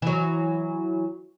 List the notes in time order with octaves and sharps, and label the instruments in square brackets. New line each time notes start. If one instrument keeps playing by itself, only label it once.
[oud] E3 F#3